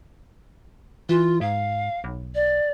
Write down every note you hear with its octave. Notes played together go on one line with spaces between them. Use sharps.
E3 F4
G#2 F5
B1
D5